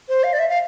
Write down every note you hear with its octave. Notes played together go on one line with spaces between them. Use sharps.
C5
F5
D5
E5
F5